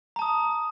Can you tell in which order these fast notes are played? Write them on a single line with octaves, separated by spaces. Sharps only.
A#5 A5 D#6